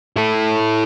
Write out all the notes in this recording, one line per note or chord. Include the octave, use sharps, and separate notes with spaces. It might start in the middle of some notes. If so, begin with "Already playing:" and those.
E4 A4